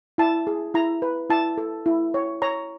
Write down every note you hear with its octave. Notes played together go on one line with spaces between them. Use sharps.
E4 A5
G#4
E4 A#5
B4
E4 A5
A4
E4
C#5
C#5 A#5